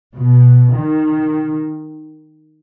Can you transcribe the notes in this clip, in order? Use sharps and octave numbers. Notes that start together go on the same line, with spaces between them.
B2
D#3